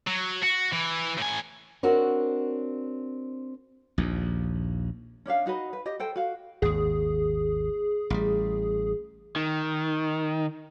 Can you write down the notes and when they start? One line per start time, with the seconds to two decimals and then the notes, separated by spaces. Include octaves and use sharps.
0.07 F#3
0.43 F#4
0.73 E3
1.18 A2 G#5
1.83 C4 D4 F#4 A#4 C#5
3.98 A#1 D#2
5.26 C#4 D4 E5 F5
5.46 D#4 F#4 B4 D#5
5.73 B4
5.86 G4 D#5
6.00 A4 C5 G5
6.16 F#4 F5
6.62 G#1 D#2 G#4
8.10 A1 G3
9.36 D#3